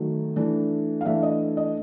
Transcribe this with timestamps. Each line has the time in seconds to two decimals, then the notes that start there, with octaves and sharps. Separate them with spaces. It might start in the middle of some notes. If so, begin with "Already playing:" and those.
Already playing: D#3 F#3 A3
0.36 E3 A3 D4
1.01 F5
1.05 E3 A3 D4 E5
1.23 D#5
1.57 D#5